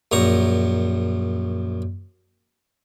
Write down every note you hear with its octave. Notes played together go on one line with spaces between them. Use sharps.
A#1 F#2 A#5 C#6